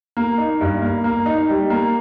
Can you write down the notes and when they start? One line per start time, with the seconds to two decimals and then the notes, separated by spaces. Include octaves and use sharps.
0.17 A#3
0.38 D#4
0.61 G2
0.82 A#3
1.04 A#3
1.26 D#4
1.48 G3
1.70 A#3